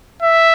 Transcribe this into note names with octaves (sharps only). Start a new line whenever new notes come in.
E5